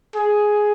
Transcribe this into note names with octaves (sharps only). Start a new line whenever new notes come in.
G#4